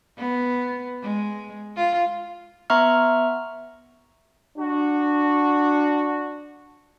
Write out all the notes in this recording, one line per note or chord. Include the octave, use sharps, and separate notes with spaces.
B3
G#3
F4
B3 E5 A#5 C#6 F6
D4 F#4